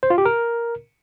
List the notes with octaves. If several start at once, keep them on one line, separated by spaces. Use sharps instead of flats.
C5
F4
G4
A#4